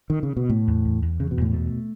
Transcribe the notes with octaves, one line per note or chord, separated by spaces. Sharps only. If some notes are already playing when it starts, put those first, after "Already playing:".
D#3
C#3
B2
A2 A3
E2
E2
E2
E2 C#3
B2
E2 A2
B2 A3